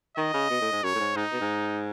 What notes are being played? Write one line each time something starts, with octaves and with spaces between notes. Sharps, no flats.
D#3 D#5
C#3
B2
A2
G#2
F#2 C#5
A2
G#2
G#2 D#4
B2
G#2